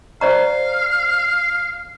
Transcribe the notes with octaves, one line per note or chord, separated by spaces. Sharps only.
C5 D5 F5 A#5